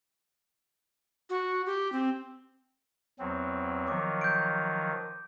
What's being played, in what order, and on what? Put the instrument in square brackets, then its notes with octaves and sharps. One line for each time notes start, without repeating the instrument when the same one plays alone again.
[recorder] F#4
G4
C4
[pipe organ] E2 F#3 C4
[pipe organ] D#3 F3 F#3 [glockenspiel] D6
[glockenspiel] G6 D7